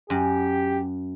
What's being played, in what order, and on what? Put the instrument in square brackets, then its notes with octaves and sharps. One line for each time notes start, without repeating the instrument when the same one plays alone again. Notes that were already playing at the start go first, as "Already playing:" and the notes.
[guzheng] F#2 [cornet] G4